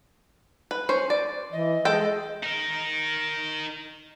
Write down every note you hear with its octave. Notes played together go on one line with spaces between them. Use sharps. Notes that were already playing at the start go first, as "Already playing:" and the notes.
B4
C#4 C5
D5
E3 D#5
G#3 A4 G5
D#4 A#4